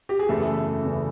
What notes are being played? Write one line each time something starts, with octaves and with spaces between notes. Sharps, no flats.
G4
G#4
F#1 E2 C#3 A3 A4
E2 C#3